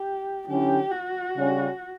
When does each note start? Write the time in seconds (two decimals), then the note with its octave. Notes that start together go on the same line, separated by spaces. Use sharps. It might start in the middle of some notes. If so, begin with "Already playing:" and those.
Already playing: G4
0.47 D3 F#3 C#4 E4 G4
0.91 F#4
1.35 C#3 G3 C#4